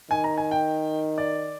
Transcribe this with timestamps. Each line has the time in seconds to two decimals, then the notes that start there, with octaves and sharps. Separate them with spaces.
0.11 D#3 G#5
0.24 A#5
0.38 G#5
0.51 G5
1.18 D5